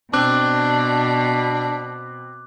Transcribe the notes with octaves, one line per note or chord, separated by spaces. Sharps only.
B2 C4 D4 D6 F#6